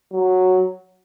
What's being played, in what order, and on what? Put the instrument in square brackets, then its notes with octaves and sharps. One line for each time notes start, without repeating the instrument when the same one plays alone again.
[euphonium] F#3